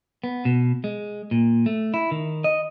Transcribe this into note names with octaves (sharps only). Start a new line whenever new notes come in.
B3
B2
G#3
A#2
A3
E4
D#3
D#5